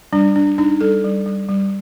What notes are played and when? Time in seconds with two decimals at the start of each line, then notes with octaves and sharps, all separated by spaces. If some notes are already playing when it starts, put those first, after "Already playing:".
0.13 G3 D4
0.36 D4
0.58 D4 D#4
0.81 G3 A4
1.04 G3
1.26 G3
1.49 G3